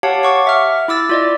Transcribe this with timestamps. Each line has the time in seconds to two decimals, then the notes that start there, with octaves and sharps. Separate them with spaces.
0.03 G4 C#5 F5 F#5 A5
0.23 F#5 C#6 D6
0.47 E5 F6
0.88 E4 D6 E6 A6
1.09 F4 D5 D#5